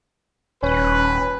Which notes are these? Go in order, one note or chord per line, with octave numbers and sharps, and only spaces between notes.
D#1 C#4 B4